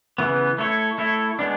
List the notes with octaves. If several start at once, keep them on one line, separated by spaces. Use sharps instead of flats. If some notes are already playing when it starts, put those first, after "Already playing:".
C#3 E3 B3
A3 E4 A4 C#5
A3 E4 A4 C#5
G#3 B3 D4